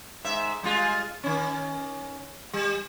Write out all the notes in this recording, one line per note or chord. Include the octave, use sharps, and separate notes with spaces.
G#2 E5
G3 G#3 F4
D#3 C#4
G3